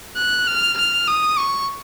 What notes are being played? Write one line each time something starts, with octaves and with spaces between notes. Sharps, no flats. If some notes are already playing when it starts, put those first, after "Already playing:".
F#6
F6
F6
D#6
C#6